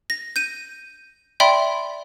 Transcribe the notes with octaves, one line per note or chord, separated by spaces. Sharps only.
A#6
G6 D#7
D5 E5 G5 B5 C6